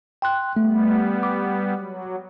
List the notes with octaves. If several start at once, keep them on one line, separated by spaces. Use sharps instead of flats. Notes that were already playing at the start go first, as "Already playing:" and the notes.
G5 C6 F#6
G3 A3 B3
D6
F#3